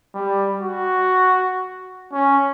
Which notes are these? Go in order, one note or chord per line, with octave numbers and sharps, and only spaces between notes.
G3
F#4
C#4